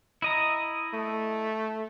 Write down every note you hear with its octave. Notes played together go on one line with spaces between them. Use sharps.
E4 D#5 A#5
A3